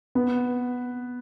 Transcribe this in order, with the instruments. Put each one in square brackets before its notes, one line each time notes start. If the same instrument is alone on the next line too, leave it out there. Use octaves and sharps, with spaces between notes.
[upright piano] B3